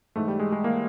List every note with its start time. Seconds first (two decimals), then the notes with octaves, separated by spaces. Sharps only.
0.16 G#2 E3 A3
0.28 G3
0.40 G#3
0.52 G#3
0.64 E3 A#3